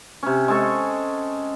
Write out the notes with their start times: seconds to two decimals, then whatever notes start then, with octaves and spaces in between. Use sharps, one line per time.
0.23 C3 C#4
0.48 G#3 A4 C#6